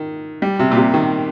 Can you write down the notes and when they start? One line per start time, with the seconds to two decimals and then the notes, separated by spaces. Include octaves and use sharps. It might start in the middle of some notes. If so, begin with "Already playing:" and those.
Already playing: D#3
0.42 G3
0.59 C3
0.71 A#2
0.77 C3
0.94 D#3